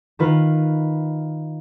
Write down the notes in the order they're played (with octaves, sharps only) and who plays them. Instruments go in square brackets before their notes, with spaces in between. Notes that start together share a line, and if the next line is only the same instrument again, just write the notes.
[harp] D#3 F4 B4 F6